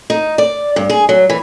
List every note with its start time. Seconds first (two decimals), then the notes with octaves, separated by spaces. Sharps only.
0.10 D#4
0.38 D5
0.76 G2
0.90 G#4
1.09 F#3
1.30 E3